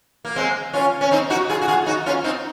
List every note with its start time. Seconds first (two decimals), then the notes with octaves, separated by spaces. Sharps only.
0.25 A#3
0.36 G#3 C4
0.73 C#4 F4
1.01 C#4
1.11 C4 D#4
1.30 D#4 F#4
1.49 F4 G#4
1.61 F#4
1.68 F4 G#4
1.86 D#4 F#4
2.06 C#4 F4
2.24 C4 D#4